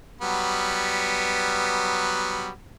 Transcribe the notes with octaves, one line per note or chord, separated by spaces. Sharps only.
F#3 G3 B3